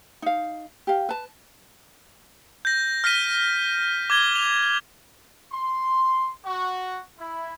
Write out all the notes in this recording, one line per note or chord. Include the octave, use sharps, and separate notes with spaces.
D#4 F5
G4 F5
B4 A5
G6 A#6
F6 A#6 B6 D#7
D6 G#6 G7
F7
C6
F#4
E4